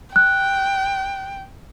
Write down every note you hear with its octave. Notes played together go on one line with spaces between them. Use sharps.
G5 F#6